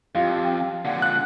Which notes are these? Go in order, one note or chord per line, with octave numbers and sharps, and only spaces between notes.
F2 F4 G4
A#2 D3 F#5
F#6